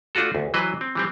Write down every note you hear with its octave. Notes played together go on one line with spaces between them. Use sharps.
A3 D4 F4 F#4 A4
D2
E3 F#3 B4 C5 D#5
C4
E3 G3 C4